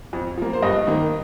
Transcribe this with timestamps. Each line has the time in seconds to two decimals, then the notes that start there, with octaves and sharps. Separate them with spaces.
0.13 F2
0.38 F3 A#3
0.53 C5
0.62 G2 D#5
0.87 D#3 A#3